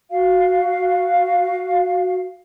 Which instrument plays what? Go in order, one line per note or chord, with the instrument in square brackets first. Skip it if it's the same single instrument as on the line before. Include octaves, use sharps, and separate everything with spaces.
[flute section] F#4 F5